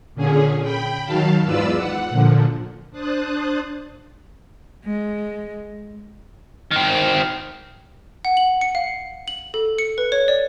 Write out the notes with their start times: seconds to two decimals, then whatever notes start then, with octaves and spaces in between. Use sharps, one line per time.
0.14 A#2 D3 C#4 G#4
0.61 G5 B5
1.05 D#3 F#3 F5 A5
1.45 E2 G#2 F4 B4 D5 E6
1.76 F#5
2.10 A#2 D3 F3
2.90 D4 C5 D#6 F#6 A6
4.85 G#3
6.71 D#3 C4
8.25 F#5
8.37 F#7
8.61 C#7
8.75 F5
9.28 F#7
9.54 A4
9.79 C#7
9.98 B4
10.12 C#5
10.28 D5